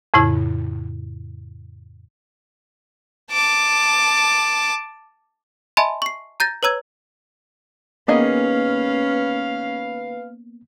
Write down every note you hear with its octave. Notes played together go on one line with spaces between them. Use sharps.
F2 A2 C#3 E4
A5 D6
D#5 E5 G#5 A5 B5 C6
C#6 C7
A#5 G6 A6 A#6
B4 C#5 A#5 E6 G#6
D#3 A#3 B3 C#4 G#4 B4 D#5 F5